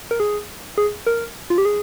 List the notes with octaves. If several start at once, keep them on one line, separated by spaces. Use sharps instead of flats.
A#4
G#4
G#4
A#4
F4
G4
G#4